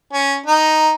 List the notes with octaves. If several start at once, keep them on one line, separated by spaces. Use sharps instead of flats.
C#4
D#4